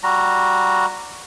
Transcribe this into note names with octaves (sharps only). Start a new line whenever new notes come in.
G3 F#4 A#5